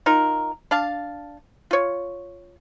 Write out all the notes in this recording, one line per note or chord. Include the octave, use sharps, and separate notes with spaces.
D#4 F4 A#4
D4 F5 A5
F4 C#5